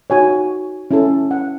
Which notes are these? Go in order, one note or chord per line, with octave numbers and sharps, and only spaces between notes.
D#4 F#4 C#5 G#5
C#4 E4 A4
F#5